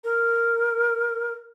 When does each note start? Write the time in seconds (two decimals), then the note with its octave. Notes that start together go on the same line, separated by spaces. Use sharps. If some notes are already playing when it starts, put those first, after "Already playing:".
0.04 A#4